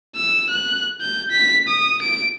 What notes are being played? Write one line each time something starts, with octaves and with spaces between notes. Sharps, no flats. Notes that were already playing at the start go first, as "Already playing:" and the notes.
E6
F#6
G6
B6
D#6
D7